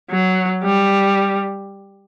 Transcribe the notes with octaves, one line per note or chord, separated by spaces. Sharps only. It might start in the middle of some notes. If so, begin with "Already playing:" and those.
F#3
G3